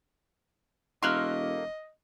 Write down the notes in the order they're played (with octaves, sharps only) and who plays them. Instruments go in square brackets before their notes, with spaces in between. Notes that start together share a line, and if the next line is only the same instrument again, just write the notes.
[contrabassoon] E1 [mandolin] A3 A#3 [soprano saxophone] D#5 [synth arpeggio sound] C6 F6 F#6